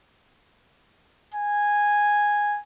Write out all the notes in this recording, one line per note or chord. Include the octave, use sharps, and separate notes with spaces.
G#5